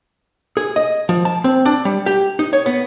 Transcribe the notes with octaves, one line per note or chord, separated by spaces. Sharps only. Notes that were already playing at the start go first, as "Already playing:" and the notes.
G#4
D#5
F3
A5
C4
D4
G3
G4
D#4
C#5
B3